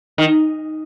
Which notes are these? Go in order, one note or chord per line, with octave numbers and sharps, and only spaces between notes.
D#3